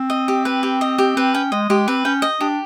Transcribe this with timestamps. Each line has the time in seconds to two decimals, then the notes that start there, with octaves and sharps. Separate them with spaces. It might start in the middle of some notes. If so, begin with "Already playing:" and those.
Already playing: C4
0.10 D#5
0.28 G4
0.45 B4
0.63 G4
0.81 D#5
0.98 G4
1.16 C4 B4
1.34 C#4 G5
1.52 G#3 D#5
1.69 G#3 G4
1.88 C4 B4
2.05 C#4 G5
2.22 D#5
2.40 D4 G4